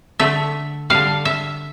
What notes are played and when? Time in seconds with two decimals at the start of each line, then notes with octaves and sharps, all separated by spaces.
0.20 D3 A3 E5
0.90 D3 G3 F5
1.25 E5